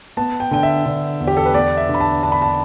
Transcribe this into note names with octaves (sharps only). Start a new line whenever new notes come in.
B3 A5
G5
D3 G5
E5
D3
E2
G4
A4
B4
B3 D5
E5
D3
B5
A5
D4 A5
B5
A5